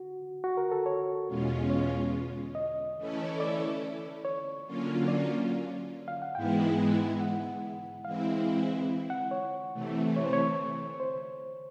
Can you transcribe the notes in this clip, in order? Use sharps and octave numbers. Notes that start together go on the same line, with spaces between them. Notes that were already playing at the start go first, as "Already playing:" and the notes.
Already playing: F#4
F#4
A#4
A4
C#5
E2 B2 G#3 C#4 F4
C#5
D#5
E3 A3 C#4 E4 A4
D5
C#5
D3 F#3 A#3 C#4 F4
D5
F5
F#5
G#2 E3 G#3 B3 E4 G5
F#5
E3 G#3 C4 E4 F5
F#5
C#5
C3 E3 A3
C#5
C5
C#5
C5